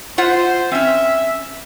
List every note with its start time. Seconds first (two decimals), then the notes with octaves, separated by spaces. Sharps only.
0.18 F4 C5 E5 F#5
0.72 C4 C#4 E5